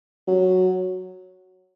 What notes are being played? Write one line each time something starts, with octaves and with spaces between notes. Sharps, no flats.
F#3